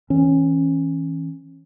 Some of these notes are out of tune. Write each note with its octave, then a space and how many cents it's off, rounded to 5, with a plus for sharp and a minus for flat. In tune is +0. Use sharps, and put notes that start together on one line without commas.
E3 -30 C#4 -20